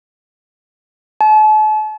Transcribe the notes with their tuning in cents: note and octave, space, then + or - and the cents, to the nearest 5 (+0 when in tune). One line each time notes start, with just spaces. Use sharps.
A5 -40